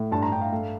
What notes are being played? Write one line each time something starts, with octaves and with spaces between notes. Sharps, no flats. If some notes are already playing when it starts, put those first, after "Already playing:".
Already playing: A2
G2 A5
A#5
G2 G5
F5
A3